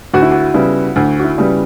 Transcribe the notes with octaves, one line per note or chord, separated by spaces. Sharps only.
D2 F#4
E4
F#4
C#3 G3 B3 E4
D2
F#4
E4
C#3 G3 B3